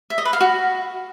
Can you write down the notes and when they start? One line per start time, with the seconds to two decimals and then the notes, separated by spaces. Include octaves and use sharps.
0.10 E5
0.18 D#5
0.25 B4
0.33 F5
0.41 F#4